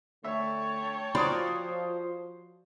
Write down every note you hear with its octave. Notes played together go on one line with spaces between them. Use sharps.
D3 A3 C#5 E5 G5 A5
F3 F#4 A#4 C5 D5 D#6